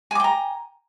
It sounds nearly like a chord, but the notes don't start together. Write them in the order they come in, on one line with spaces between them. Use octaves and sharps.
G#5 D6 G5 A#5